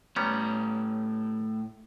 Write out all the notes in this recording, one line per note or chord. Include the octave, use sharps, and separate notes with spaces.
A2 G3 B3 C#4 A#5